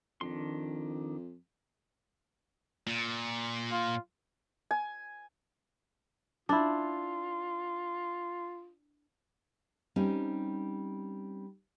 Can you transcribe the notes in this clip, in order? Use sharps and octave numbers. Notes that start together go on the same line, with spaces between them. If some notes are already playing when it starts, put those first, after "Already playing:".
F2 D#3 D4 C6
A#2
F4
G#5
D4 E4 F4
G3 C4 C#4 D#4